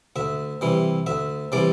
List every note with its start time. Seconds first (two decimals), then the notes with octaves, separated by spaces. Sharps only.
0.16 D2 E5
0.61 C3 E3 G3
1.07 D2 E5
1.52 C3 E3 G3 D5